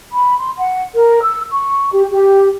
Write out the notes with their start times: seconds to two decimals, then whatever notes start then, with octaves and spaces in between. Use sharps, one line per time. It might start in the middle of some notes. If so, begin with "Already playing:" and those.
0.13 B5
0.38 C6
0.57 F#5
0.93 A#4
1.22 E6
1.49 C#6
1.91 G4
2.11 G4